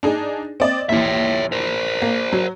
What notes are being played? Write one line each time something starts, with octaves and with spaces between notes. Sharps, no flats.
D4 D#4 G#4
C4 D5 D#5
A#1 D#2 E3 C#5 E5
A#4 C5
A#3
F#3